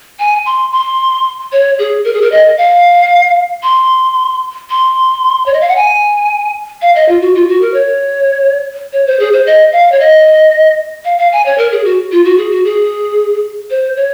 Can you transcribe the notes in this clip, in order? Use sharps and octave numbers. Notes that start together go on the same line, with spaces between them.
G#5
C6
C6
C#5
G#4
A#4
G#4
A#4
D#5
F5
C6
C6
C#5
D#5
F5
F#5
G#5
F5
D#5
F4
F#4
F4
F#4
A#4
C#5
C#5
C5
G#4
C5
D#5
F5
C#5
D#5
F5
F5
G#5
C#5
A#4
G#4
F#4
F4
F#4
G#4
F#4
G#4
C5
C#5